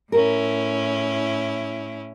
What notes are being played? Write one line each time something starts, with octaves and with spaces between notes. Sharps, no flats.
A2 C#4 E4 A#4